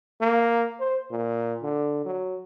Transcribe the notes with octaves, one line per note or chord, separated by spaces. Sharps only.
A#3
C5
A#2
D3
F#3